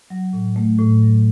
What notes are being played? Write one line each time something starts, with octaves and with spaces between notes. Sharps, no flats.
F#3
A2
A3
A2
F#3